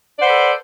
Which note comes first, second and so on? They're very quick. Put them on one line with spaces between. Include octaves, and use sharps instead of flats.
D5 F#5 C5 B4 A4